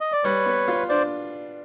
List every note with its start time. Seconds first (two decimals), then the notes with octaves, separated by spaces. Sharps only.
0.01 D#5
0.12 D5
0.24 G3 B4 C#5
0.46 B3
0.68 F4
0.89 D4 C5 D5